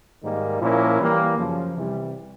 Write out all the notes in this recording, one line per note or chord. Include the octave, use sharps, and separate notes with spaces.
G#2 D#3 G3 A#3 D#4
A#2 F3 A#3 C#4 E4
E3 G3 A#3
F#2 C#3 F3
C3 E3 G3